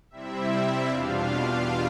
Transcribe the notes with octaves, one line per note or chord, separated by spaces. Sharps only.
C3 G3 C4 E4 E5
E2 B2 G3 D4 F4 F5